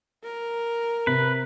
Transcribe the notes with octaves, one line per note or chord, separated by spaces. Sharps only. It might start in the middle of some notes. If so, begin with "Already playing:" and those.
A#4
C3 B4